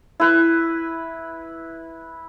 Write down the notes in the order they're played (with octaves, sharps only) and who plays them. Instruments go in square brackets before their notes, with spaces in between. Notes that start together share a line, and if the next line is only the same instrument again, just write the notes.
[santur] E4 B4